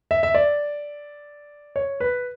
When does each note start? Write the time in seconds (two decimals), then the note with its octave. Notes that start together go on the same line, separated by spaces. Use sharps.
0.11 E5
0.23 E5
0.35 D5
1.76 C#5
2.00 B4